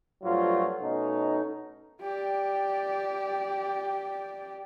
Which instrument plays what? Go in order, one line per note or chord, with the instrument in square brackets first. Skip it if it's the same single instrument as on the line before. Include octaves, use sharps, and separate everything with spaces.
[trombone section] G2 F3 F#3 A3 F4
B2 A3 C#4 D#4
[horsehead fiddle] G4 D5